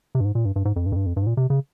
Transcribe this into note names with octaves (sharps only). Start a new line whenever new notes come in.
C3
G2
G#2
A#2
G2
G2
G#2
F2
G2
F2
G2
F2
G2
G#2
A#2
C3
C#3